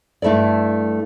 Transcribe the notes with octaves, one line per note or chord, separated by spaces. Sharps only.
G2 A3 E4 A4 D5